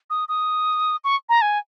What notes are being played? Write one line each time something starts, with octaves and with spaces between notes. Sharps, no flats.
D#6
D#6
C#6
A#5
G#5